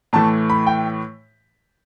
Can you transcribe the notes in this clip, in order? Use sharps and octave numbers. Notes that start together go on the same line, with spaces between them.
A2 E3 A3 A5
B5
G5